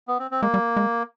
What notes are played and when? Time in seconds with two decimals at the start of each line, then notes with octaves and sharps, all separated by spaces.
0.08 B3
0.19 C4
0.31 C4
0.42 G#3 A#3
0.54 G3
0.77 G#3